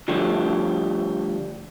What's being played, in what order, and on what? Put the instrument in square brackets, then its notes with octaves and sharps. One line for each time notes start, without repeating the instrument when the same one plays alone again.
[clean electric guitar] D3 F3 G3 A3